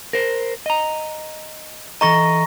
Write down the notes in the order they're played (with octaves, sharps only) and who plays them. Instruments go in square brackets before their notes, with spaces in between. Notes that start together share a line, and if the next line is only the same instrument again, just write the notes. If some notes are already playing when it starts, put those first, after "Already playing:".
[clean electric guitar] A#4 C5
D#5 A#5
[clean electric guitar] E3 A4 D#5 [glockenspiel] A#5 C#6 A#6